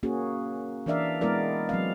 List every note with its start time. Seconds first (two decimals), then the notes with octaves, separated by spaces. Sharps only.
0.03 A#3 C#4 F#4 G#4
0.86 E3 D4 A#4 D5 E5 F5
1.21 G#3 B3 E4 A#4 D5
1.69 F#3 C4 F5